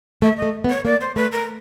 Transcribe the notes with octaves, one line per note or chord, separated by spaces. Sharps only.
A3 E5
D#5
A3
B3
C#5
A#3 D5
C5
A3 B4
A#4